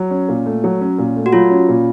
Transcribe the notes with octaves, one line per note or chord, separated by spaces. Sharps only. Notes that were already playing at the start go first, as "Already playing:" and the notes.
Already playing: F#3
C#4
A#2
A3
F#3
C#4
A#2
A3
F#4
F#3 F4
C#4
A#2